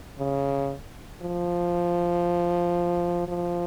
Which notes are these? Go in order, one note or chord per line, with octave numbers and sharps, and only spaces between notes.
C#3
F3
F3